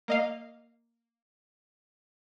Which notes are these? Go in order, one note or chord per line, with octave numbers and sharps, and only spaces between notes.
A#3 D#5 F5